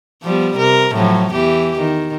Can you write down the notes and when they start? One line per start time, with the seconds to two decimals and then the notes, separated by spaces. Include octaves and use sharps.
0.23 F3 G3 B3
0.57 C3 A#4
0.93 A2 F3 F#3
1.32 E2 E3 G4
1.79 D#3